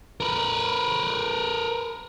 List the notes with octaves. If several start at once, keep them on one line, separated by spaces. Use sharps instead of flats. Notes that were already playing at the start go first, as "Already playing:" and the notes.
A#4 B4